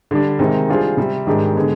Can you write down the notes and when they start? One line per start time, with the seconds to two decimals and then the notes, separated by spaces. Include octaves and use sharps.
0.11 D3 G3 D4
0.39 C3 D#3 G#3 C4 D#4
0.69 G3 D4 F4 G#4 C5
0.97 C3 G3 C4
1.27 G#2 D#3 G#3 D4 G4
1.55 D3 G#3 B3